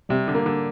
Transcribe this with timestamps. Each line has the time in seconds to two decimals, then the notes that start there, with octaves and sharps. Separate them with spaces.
0.09 C3 G3
0.28 D3
0.34 A#3
0.46 D3